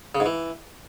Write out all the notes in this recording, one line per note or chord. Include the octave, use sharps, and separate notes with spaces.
C#3
G#2
E3